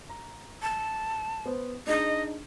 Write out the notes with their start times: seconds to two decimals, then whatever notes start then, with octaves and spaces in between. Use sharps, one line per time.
0.09 A#5
0.62 A5
1.46 B3 C5
1.87 D4 D#4 G#4 D#5